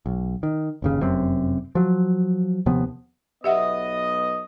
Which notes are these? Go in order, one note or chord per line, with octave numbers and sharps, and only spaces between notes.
B1
D#3
G1 D#2 C#3
F1 F#2 C3 C4
F3 F#3
D#2 C3 F3 B3
B1 B3 G4 D#5 E5 F#5